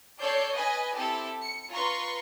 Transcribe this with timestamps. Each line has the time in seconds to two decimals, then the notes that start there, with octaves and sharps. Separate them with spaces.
0.21 A4 C#5 D5 G6 C7
0.54 B4 D#5 G#5
0.95 C4 E4 G4 A4
1.43 C#7
1.73 F4 B4 A#5 C6 C#6